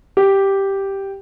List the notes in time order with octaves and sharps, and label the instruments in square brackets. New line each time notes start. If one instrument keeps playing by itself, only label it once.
[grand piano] G4